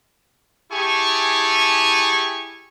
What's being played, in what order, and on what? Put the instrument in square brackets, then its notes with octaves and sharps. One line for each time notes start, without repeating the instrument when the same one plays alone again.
[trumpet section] E4 G4 G#4 G#5 A5 C#6